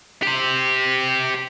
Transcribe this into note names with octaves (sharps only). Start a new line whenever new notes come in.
G4 C5